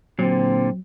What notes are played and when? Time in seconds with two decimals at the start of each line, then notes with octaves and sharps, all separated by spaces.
0.19 A#2 D3 F#3 C4